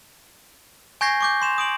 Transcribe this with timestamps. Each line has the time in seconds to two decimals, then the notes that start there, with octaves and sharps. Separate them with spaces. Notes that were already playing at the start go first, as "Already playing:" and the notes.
1.01 G#5 C#6 G6 G#6 A#6 C7
1.20 C#6 D6 G6
1.42 C6 E7 F7
1.58 D#6 D7 F#7